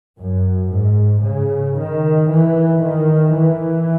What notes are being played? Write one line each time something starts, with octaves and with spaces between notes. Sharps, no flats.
F#2
G#2
C#3
D#3
E3
D#3
E3